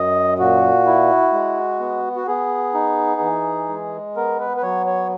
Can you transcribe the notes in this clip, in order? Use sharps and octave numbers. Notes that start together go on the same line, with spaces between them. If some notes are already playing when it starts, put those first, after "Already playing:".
Already playing: F#2 D#5
A#2 F#4
E4
G#3
B3
F#4
B3 G#4
D#4
E3
G#3
B3 A#4
B4
B4
F#3 C#5
C#5